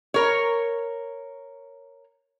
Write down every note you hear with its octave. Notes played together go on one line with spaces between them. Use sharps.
A#4 C#5